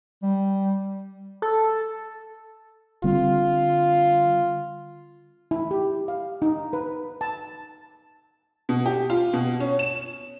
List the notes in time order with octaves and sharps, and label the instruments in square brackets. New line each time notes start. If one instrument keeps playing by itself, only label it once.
[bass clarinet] G3
[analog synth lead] A4
[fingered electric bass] D3 G3 C4 [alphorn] F4
[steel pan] E4
G4
F5
D#4
B4
A5
[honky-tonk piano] B2
G4
F4
B2
C#4
E7